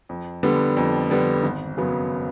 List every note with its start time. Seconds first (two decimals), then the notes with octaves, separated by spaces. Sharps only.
0.09 F2
0.43 D3 G3 B3
0.77 F2
1.10 D3 G3 B3
1.44 G#1
1.77 F#2 C#3 F#3 B3